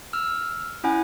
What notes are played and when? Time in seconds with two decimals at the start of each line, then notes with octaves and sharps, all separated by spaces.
0.13 E6 F6
0.84 C#4 E4 F#5 G#5